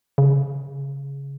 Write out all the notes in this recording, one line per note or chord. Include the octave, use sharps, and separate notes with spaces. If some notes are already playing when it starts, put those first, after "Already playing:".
C#3